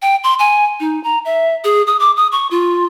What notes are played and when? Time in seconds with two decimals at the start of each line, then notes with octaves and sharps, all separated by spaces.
0.02 G5
0.24 C6
0.39 G#5
0.80 D#4
1.04 A#5
1.25 E5
1.64 G#4
1.87 D#6
2.00 D6
2.17 D#6
2.32 C#6
2.51 F4